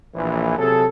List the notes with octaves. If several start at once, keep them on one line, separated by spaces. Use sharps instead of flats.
A#1 E3
C3 F#3 G#4 A4